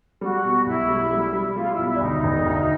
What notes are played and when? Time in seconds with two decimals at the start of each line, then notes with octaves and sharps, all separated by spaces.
0.21 G3 F#4
0.44 B2
0.66 B1 E4
0.89 G3
1.11 G3
1.33 G3
1.55 G3 F4
1.71 E4
1.78 B1
1.85 E4
1.93 D4
2.01 D2 D#4
2.23 E1
2.45 D2